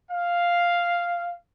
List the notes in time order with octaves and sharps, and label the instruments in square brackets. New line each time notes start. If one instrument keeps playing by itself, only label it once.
[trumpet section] F5